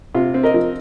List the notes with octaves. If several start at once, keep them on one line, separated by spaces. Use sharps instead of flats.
C3 F4
C4
A#4 D#5
F3